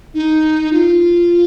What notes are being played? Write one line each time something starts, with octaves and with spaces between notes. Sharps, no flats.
D#4
F4